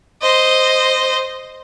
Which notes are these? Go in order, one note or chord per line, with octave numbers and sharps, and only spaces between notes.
C5 D#5